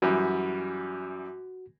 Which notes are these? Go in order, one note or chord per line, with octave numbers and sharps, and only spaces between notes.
F#2 E3 G3 F#4